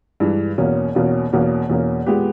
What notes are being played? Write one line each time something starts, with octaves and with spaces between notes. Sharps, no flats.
G2 E3 G#3
E2 B2 A#3 C#4
E2 B2 A#3 C#4
E2 B2 A#3 C#4
E2 B2 A#3 C#4
A#2 G#3 B3 G4